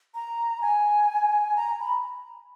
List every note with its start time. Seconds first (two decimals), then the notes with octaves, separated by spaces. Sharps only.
0.14 A#5
0.62 G#5
1.56 A#5
1.80 B5